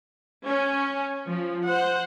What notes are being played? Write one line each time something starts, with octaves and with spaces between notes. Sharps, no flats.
C#4
F3
C5 F#5